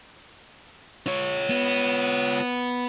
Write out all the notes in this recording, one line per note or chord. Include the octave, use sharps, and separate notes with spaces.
F4 C#5
B3